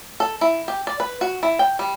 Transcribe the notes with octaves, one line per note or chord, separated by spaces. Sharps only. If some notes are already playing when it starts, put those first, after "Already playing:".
A4
E4
G4
D5
B4
F#4
E4
G5
G3